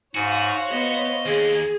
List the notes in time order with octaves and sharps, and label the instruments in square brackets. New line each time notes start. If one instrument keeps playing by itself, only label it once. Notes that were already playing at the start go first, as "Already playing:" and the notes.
[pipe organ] G#2 G#5 [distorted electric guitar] F#4 [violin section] C5 C#5 F5
[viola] B3 [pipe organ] D#5
[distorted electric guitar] D#2 [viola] G#4